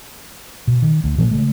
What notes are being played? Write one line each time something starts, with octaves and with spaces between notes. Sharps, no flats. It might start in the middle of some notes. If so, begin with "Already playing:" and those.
B2
D#3
D2
A#2 E3 F3 A#3
C#3 G#3 A3